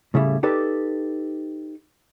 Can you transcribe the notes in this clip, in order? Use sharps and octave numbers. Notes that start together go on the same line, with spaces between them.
A2 C#3 G3 E4
D#4 G4 A4 B4 D5